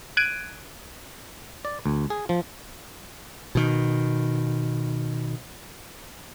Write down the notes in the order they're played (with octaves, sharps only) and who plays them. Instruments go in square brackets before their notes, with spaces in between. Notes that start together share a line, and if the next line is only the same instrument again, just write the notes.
[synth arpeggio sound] F#6 G#6 D7 D#7
[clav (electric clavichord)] D5
D2
G#4
F3
[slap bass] B2 D#3